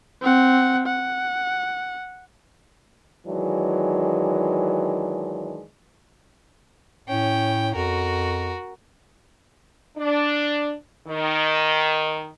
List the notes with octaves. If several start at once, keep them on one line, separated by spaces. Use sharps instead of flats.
C4 F#5
F#5
D#3 E3 F#3 G#3 D4
A2 C#4 G5
F2 F#4 A#4
D4
D#3